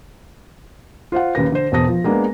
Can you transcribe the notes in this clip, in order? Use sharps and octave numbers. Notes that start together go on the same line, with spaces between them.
F4 C5 F5 F#5
D#2 C#3 B4 A#6
D3 C5
E1 E2 C5 A5 D#6 A#6
F3
G#3 A#3 B3 D4